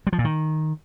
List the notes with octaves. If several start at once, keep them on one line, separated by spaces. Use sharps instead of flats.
G3
F3
A#2
D#3